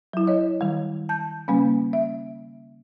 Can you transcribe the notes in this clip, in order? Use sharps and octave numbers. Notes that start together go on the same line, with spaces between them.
F#3 E4
C#5 D#5
D#3 G3
A5 G6
C#3 G3 A#3 C#4
E5